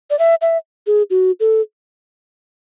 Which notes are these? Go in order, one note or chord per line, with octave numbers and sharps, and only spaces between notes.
D5
E5
E5
G#4
F#4
A4